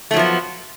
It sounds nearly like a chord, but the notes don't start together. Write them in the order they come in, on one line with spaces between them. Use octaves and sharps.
A3 F#3 F3 B3